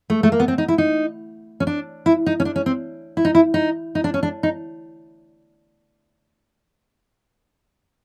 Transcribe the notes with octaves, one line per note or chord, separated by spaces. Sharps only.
A3
A3
A#3
B3
C4
D#4
E4
D#4
C#4
D4
E4
D#4
C#4
D4
C#4
C4
E4
D#4
E4
D#4
D#4
D4
C#4
D4
D#4